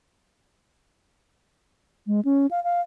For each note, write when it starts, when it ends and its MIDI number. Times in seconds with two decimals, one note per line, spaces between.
2.07 2.21 56
2.25 2.46 61
2.51 2.62 77
2.64 2.81 77